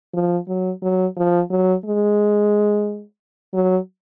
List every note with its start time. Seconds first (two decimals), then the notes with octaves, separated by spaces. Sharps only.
0.14 F3
0.48 F#3
0.82 F#3
1.17 F3
1.50 F#3
1.85 G#3
3.54 F#3